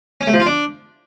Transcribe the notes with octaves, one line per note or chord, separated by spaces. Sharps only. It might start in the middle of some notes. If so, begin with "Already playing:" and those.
C#4
A3
F3
F4
D4